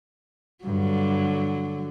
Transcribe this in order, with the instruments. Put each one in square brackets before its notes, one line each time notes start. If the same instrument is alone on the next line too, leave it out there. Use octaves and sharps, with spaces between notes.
[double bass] G2 [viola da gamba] D3 F#3